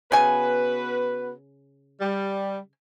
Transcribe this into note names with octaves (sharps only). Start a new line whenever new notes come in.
C#3 B3 F#4 B4 G#5
G3